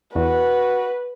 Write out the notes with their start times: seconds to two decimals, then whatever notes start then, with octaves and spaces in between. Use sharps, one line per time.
0.15 E2 F#4 B4